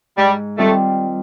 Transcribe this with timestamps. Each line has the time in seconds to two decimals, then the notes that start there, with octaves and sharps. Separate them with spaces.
0.17 G#2 G3
0.58 D#3 G3 A3 C4 F4